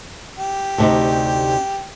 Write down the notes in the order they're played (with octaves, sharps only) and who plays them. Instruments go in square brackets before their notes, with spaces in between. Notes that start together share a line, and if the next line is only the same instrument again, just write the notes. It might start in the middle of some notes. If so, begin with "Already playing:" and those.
[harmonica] G4
[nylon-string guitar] D2 C3 D#4